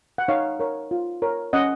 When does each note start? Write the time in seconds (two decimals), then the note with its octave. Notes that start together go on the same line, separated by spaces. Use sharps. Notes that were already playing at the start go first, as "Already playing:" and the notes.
0.18 F#5
0.28 D#4 C#5 F5
0.60 A#4 C#5
0.91 F4
1.22 A#4 C#5
1.53 C#4 D#5 F#5